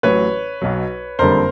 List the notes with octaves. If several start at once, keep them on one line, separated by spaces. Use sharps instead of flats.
A1 A2 F#3 B4 C#5
B1 B2 F#3
F#1 F2 D3 G3 A#4 C5